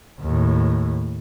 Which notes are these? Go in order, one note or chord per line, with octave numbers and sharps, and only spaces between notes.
D#2 A2